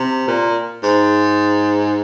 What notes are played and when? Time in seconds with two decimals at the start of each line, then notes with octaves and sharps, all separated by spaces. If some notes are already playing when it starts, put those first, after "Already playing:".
Already playing: C3
0.28 A#2
0.83 G#2